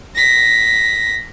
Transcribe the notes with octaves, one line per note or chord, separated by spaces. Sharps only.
A#6 B6